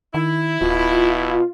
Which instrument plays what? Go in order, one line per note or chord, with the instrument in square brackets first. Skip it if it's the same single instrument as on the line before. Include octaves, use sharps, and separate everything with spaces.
[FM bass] D#3 [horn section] E4
[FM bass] D1 [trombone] B2 [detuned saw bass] F4